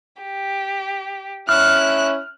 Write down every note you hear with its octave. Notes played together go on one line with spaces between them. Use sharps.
G4
C#4 E4 F6 F#6